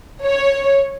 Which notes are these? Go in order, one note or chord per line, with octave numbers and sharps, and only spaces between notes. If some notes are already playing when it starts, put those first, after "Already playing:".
C#5